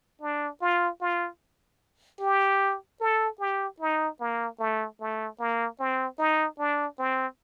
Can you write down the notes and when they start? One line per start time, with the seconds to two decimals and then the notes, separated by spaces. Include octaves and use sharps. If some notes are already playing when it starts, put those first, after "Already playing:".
0.21 D4
0.61 F4
1.01 F4
2.20 G4
3.01 A4
3.40 G4
3.80 D#4
4.20 A#3
4.59 A3
5.00 A3
5.39 A#3
5.79 C4
6.18 D#4
6.59 D4
6.99 C4